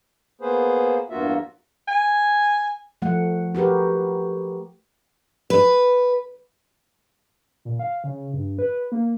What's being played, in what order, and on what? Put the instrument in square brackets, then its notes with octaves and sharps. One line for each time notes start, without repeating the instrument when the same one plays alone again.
[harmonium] A#3 B3 G#4 B4 C5
E2 G2 A#3 F4 F#4 E5
[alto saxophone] G#5
[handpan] F3 A3 F#5
F#4 G4 A#4 B4
[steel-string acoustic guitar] B4
[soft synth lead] A#2
F5
C#3
G2
B4
A#3